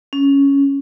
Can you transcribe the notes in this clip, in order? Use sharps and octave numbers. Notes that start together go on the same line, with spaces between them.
C#4